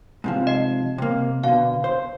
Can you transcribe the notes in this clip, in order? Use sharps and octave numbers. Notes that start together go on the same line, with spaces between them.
G#2 C3 F3
D#5 C7
C3 A#3
B2 D3 F5
C5